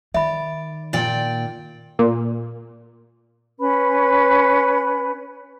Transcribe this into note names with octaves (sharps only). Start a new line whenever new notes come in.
D#3 D5 E5 B5
A#2 D5 G5
A#2
C#4 B4 B5